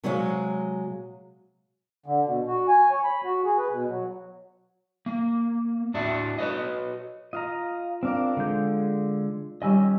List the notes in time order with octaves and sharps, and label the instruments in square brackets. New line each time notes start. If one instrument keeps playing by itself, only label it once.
[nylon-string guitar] C3 F#3 G#3 C#5 F5
[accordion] D3
B2
F#4
G#5
C#5
B5
F#4
G#4
B4
B2
F#3
[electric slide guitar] A#3
A2 D4 F#4 E5
F#4 B4 C#5 D#5
[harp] F4 [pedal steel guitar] D#5 F5 A#5
[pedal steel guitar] C4 D4 A#4 [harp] F5 D6 F6
[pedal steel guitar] D3 G#3 G6
[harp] D#3 G3 C#4 [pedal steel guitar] D#5 G#5 E6